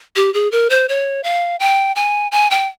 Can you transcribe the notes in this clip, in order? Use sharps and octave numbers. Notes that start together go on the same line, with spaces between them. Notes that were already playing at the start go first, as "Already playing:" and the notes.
G4
G#4
A#4
C5
C#5
F5
G5
G#5
G#5
G5